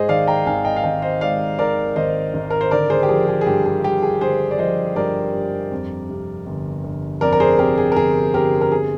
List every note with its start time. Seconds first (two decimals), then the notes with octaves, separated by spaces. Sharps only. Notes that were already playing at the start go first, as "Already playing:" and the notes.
Already playing: G#2 G#4 C5 D#5
0.09 D#3 D5 F5
0.27 G5 A#5
0.46 G#1 F5 G#5
0.65 D#5 G5
0.76 F5
0.84 G#1 D#5 G5
1.02 C5 D#5
1.21 G#2 D5 F5
1.59 D#3 A#4 D5
1.96 G#1 C5 D#5
2.34 G#1
2.50 A#4
2.61 C5
2.71 D3 A#4 D5
2.90 G#4 C5
3.03 G4
3.09 F3 G#4
3.28 G#4
3.41 G#4
3.46 G2 G4
3.65 G#4
3.84 G2 G4
4.03 G#4
4.21 D3 G#4 C5
4.51 D5
4.58 F3 C5 D#5
4.96 G2 A#4 D5
5.34 G2
5.72 F2
6.10 C3
6.47 G1
6.84 G1
7.21 F2 A#4 D5
7.33 A#4
7.40 G#4 C5
7.59 C3 G4 A#4
7.78 G#4
7.92 A#4
7.96 G1 G#4
8.34 G1 G4 A#4
8.61 A#4
8.72 C3 G#4